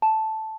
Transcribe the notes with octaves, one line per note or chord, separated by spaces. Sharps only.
A5